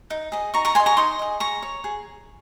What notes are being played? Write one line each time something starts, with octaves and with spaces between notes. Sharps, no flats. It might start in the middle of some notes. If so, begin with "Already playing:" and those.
D#4
G#4 D#5
D#4 A#5 C#6
A#5 C#6
G#4 D#5 G#5 C6
A#5 C#6
D#4 C6 D#6
G#4 D#5
G#4 A#5 C#6
C#5
G#4